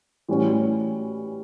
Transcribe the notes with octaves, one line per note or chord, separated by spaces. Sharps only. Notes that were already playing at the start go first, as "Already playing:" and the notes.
A2 E3 G3 C#4 F#4